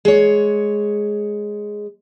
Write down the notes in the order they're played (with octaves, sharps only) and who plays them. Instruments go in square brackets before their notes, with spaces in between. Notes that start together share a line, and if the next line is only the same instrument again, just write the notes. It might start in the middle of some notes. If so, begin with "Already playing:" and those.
[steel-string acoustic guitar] G#3 C#5